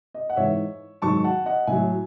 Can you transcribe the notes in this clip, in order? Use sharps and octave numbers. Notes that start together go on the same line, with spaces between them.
D#5
F#5
G#2 E3 C#5 E5
G#2 D#3 F#3 A5 C#6
F#5 A5
D#5 F#5
A2 F#3 E5 G#5